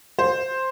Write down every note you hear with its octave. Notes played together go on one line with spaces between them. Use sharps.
C5